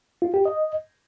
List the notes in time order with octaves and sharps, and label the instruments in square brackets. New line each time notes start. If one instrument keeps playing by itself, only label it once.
[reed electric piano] F4
G4
D#5